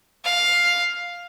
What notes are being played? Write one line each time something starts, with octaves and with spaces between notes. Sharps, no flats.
F5